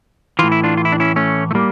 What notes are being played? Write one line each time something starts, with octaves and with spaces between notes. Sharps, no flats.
A2 E3 F4
E4
D4 F4
F4
E4
D4
C#4 E4
A3 C#4
A3
G3 A#3